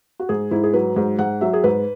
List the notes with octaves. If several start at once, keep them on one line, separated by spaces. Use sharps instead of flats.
F#4
G#2 G#4
G#2 E4
G#4
F#3 B4
G#2
G#2 F#5
F#3 E5
G#4
G#2 B4